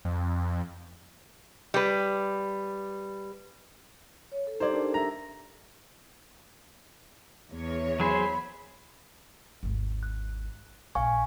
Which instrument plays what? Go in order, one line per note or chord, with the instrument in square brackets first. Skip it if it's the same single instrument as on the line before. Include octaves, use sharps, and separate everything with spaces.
[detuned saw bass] F2
[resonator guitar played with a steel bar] G3 B4
[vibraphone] C#5
A4
[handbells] D#4 G4 G#6 [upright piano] C5 D5
[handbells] D4 G4 A#4
[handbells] E5 A#6 [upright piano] A#5
[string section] E2 C#5
[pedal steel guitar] F#3 G#4 C5 [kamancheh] B5
[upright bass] G#1 D#2
[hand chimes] F#6
[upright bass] A#1 E4 [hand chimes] F5 G#5 C#6